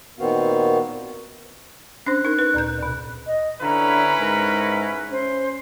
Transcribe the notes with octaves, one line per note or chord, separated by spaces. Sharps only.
A#2 D#3 B3 C4 F#4 F5
C#4 D4 C5 F#6
D#4 A#4
B4
D2 A#2 G6
D2 B2
D#5
D3 C#4 E4 B4 A#5
G#2 A#4
C#4 C5